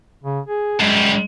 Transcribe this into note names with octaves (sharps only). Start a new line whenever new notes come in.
C#3
G#4
F#2 G3 G#3